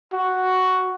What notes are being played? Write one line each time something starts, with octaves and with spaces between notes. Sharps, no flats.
F#4